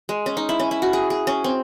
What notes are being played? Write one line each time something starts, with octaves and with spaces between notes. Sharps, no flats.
G#3
C#4
D#4
E4
C#4
E4
F#4
G#4
G#4
C#4
C4